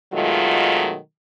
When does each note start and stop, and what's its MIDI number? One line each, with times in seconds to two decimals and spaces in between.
0.13 0.95 47
0.13 0.95 51
0.13 0.95 54
0.13 0.95 56
0.13 0.95 57
0.13 0.95 65